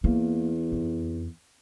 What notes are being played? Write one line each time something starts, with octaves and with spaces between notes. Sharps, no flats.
E2 A#3
F2